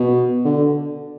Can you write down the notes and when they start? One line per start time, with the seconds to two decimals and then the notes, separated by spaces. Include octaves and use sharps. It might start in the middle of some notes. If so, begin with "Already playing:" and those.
Already playing: B2
0.45 D3